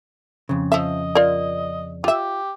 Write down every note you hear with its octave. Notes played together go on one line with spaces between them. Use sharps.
F2 C#3
F3 D#5 E5
F4 A#4 D5
F4 G4 E5